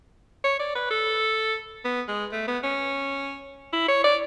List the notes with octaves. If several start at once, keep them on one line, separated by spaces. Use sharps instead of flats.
C#5
D5
B4
A4
B3
G#3
A3
B3
C#4
E4
C#5
D5